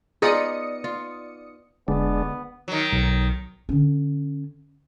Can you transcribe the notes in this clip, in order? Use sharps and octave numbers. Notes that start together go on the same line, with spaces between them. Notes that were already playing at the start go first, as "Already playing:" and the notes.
B3 D#4 F4 G#4 D5 D#6 C#7
F4
E1 D2 G#3 B3 D4
D#3 F#3
B1
D3 C#4